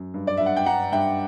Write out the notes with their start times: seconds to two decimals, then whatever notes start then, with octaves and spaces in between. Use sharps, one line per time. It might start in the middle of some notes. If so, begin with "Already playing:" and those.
Already playing: F#2
0.14 G2
0.27 D5
0.37 G2 E5
0.46 F#5
0.57 G5
0.66 G2 F#5 A#5
0.92 G2 E5 G5